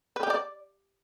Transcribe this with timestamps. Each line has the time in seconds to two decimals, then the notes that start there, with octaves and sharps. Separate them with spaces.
0.16 B4
0.23 G4
0.30 D5